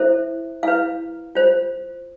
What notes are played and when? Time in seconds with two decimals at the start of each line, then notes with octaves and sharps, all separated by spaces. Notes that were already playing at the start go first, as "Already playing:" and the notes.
Already playing: E4 A4 C5 E5
0.63 E4 B4 F5
1.35 F4 C5